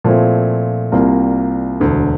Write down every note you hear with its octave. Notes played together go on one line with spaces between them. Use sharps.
A#2 F3 A3 C4 E4
C2 C3 G3 A#3 F4
E1 D2 D3